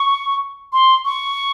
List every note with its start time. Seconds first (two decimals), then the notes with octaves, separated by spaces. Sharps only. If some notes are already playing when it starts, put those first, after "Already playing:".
Already playing: C#6
0.73 C6
1.05 C#6